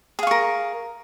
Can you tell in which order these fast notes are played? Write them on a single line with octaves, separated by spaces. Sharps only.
G#4 F5 C#6 A#4